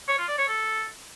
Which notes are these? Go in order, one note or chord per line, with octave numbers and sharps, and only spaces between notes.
C#5
F4
D5
C#5
A4